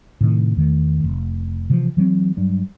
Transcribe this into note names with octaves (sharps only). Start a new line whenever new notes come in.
A2 C3 D#3
E2 D#3 A3
F1
C3 E3 F3
E3 F#3 A3 C4
G2 F#3